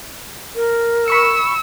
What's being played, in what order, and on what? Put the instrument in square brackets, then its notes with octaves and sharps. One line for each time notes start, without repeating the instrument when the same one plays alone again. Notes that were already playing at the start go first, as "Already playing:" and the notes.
[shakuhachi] A#4
[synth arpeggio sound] B5 C#6 C#7 [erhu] E6